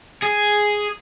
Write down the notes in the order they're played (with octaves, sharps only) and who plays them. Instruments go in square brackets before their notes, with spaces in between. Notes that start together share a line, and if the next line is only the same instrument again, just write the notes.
[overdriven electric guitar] G#4